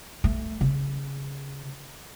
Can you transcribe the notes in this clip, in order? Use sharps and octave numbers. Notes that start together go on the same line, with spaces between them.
A3
C#3